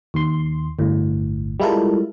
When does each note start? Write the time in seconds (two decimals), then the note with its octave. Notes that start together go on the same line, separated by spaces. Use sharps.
0.14 D#2 C6
0.79 G1 D2 A2
1.60 G3 G#3 E4 F4 A4 A#4